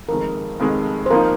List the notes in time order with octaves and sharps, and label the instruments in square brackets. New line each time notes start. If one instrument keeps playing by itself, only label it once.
[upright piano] F1 F2 D#3 G#3 [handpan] A#4
[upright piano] F1 F2 D#3 G#3
[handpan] C5
[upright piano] G#1 F3 A#3 D#4 [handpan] A#4